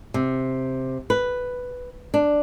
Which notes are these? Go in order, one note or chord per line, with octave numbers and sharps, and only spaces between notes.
C3
B4
D4